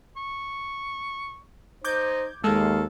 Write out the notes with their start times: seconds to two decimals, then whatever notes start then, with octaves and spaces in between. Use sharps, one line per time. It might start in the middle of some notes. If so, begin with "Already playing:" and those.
0.17 C#6
1.85 D#4 C5 D6 G6 G#6
2.44 D#2 G#3 A4 F5